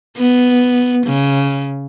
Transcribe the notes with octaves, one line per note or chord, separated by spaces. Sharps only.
B3
C#3